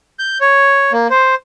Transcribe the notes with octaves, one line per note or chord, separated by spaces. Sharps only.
G6
C#5
A#3
C5